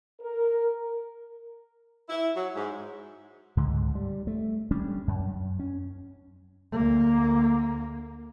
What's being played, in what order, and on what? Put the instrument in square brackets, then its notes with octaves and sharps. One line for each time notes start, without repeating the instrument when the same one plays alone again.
[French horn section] A#4
[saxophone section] E4
F#3
G#2
[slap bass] C#2 G#2 D3
G3
A3
G3 C#4 D4
F#2
C#4
[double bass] D2 A#3